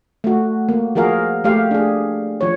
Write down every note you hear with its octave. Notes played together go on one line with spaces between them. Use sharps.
A3 F#4
A#3
F3 F#4 G#4 A#4 F5
A3 G4 F5
D4 G#4
F3 C#5